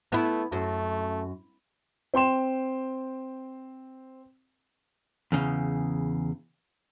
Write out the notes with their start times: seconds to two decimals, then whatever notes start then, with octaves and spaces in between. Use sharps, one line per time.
0.12 A3 B3 E4
0.52 F#2 A3
2.14 C4 G5 C6 E7
5.32 E2 C#3